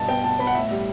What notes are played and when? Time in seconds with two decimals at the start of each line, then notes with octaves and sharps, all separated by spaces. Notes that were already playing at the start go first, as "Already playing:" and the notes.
Already playing: G2 B2 A5
0.08 B3 G5
0.24 B2 A5
0.39 B3 B5
0.47 F#5
0.55 A2 E5
0.71 G3